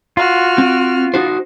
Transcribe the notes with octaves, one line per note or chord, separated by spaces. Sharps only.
F4 F#4 F6
C4
D#4 F#4 C5